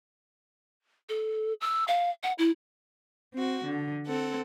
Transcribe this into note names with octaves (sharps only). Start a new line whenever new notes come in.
A4
E6
F5
F#5
E4
C4 F#4
D3
C4 A4 F#5